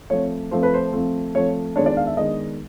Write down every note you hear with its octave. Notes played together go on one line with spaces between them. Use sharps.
F3 A3 C4 C#5
F3 A3 C4 C5
B4
C5
F3 A3 C4
F3 A3 C4 C#5
D#3 G#3 B3 D4 C#5
D5
F5
E5
D#3 G#3 B3 D4 D#5